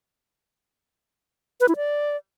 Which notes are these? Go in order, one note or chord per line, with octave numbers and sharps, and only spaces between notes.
B4
E4
D5